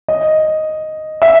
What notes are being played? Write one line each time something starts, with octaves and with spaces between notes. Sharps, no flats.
D#5
E5